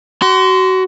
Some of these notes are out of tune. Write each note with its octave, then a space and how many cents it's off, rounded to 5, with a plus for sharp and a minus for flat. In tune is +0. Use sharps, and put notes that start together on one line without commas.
F#4 +25 C6 -20